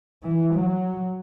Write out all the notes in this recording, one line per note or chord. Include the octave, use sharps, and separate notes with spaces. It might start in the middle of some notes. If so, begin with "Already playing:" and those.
E3
F#3